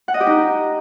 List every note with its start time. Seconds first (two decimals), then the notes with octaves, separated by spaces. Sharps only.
0.08 F#5
0.14 D#5
0.20 G4
0.27 D#4